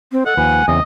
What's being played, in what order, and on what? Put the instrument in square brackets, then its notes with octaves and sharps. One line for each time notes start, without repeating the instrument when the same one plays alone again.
[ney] C4
[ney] A4 [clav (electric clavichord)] D#5 [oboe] F#5
[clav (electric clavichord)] D#2 F3 B4 [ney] G#5
[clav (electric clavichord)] E2 C#3 C4 [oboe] D#5